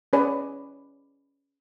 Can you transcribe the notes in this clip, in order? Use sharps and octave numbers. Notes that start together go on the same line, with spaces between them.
C#4 G#4 B4 C#5 D5 G#5